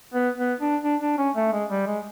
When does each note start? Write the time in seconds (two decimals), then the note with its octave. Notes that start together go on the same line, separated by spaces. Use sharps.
0.14 B3
0.38 B3
0.61 D4
0.83 D4
1.01 D4
1.18 C#4
1.36 A3
1.53 G#3
1.70 G3
1.87 G#3